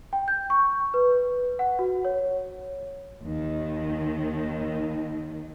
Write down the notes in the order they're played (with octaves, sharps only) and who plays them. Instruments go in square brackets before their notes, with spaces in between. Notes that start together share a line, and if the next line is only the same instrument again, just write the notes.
[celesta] G5
G6
C#6
B4
F#5
F#4
C#5
[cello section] D#2 D#3